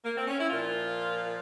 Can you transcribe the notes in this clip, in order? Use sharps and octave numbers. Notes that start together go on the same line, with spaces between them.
A#3
C4
C#4
E4
A#2 F4
F3